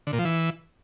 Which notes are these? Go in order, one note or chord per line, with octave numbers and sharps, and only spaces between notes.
D3
A#2
F3
E3